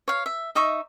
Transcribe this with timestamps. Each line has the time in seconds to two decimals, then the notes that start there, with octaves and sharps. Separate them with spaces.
0.08 C#5 F5
0.26 E5
0.55 D#4 D#5 E5 C#6